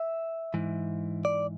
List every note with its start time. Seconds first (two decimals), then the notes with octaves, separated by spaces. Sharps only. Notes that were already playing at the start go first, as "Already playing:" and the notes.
Already playing: E5
0.54 G#2 E3
1.25 D5